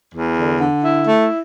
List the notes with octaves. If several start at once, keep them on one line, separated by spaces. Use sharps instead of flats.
E2
D3
D3
E4
A3